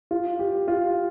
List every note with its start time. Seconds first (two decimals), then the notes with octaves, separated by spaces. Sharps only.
0.11 F4
0.39 G4
0.68 F4